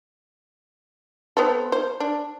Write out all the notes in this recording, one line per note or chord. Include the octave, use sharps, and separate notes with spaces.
B3 C4 A4
C5
D4